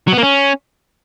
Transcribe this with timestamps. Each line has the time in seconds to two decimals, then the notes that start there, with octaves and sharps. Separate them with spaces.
0.08 F#3
0.13 B3
0.18 A#3
0.23 C#4